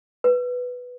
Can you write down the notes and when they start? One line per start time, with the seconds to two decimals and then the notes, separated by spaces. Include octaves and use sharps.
0.24 B4